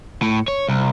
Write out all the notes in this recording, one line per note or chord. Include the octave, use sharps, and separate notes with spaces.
A2
C#5
C2